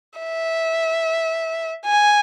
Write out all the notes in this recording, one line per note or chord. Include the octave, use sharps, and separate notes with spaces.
E5
G#5